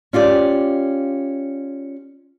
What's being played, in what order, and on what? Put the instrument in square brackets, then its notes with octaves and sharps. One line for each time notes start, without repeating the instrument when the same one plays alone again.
[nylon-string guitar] C#4 F4 G4 D5